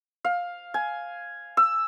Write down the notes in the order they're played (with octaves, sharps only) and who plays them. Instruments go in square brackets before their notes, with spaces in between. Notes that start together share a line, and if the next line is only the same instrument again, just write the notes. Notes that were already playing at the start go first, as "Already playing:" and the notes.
[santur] F5
G#5
E6